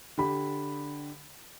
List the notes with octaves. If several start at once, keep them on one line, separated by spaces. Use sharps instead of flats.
D3 G4 B5